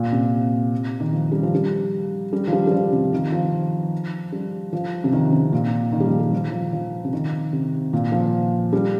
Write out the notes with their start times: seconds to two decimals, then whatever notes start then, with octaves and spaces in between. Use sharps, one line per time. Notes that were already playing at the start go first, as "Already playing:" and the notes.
Already playing: A#2
0.12 C3
1.00 D#3
1.13 F3
1.32 G3
1.43 F3
1.55 G3
2.33 G3
2.48 F3
2.53 G3
2.67 G3
2.72 F3
2.93 C3
3.13 D#3
3.32 F3
4.32 G3
4.73 F3
5.04 C3
5.13 D#3
5.33 C3
5.53 A#2
5.92 D#3
6.00 G3
6.06 F3
6.19 G3
6.33 F3
6.52 F3
6.73 F3
7.05 C3
7.13 D#3
7.53 C3
7.93 A#2
8.12 F3
8.73 G3